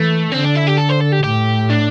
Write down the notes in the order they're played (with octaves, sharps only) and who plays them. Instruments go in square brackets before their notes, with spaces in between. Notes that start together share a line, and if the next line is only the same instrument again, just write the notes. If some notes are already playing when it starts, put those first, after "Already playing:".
Already playing: [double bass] E3 [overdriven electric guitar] A3
[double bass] D3 [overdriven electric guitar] C4
[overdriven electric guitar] D4
E4
G4
A4
C5
A4
G4
[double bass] A2 [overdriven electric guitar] G4
[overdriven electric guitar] D4